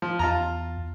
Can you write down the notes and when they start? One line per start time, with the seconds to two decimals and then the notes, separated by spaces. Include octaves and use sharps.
0.02 F3
0.19 E2 F4 A5 A#5